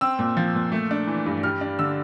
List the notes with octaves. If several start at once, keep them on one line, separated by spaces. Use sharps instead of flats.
C4 E6
A#2
F3
A#2
A3
D4
E3
G2
G3 F6
D4
D3 E6